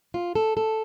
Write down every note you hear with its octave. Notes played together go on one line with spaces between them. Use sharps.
F4
A4
A4